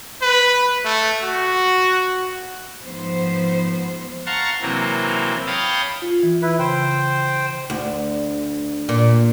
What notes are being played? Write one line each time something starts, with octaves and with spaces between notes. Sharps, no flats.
B4
A3
F#4
G#2 F3 B3 C5
F5 F#5 A5 A#5 C6 C#6
C3 E3 F#3 A#3 C4
C#5 F5 G5 A5 B5 D#6
F4
E3
E4 B4
C#3 C5 G5
D2
A#2